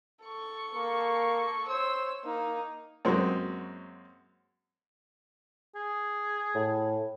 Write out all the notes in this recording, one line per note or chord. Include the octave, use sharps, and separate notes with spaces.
A4 C#6
A#3
C5 C#5 E6
A#3 D#4
F#2 G#3 A#3 C4 F#4
G#4
A2